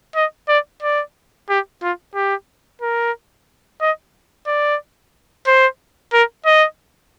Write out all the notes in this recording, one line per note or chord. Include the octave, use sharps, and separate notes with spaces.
D#5
D5
D5
G4
F4
G4
A#4
D#5
D5
C5
A#4
D#5